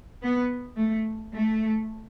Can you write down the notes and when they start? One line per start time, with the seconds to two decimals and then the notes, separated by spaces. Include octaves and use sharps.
0.23 B3
0.77 A3
1.33 A3